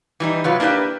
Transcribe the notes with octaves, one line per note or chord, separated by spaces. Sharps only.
E3 G3 D#4
E2 C3 F#3 F4 B4
A#3 D4 E4 G4 B4